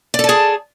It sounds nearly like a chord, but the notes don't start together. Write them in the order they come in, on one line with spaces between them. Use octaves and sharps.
D5 A4 A5 G#4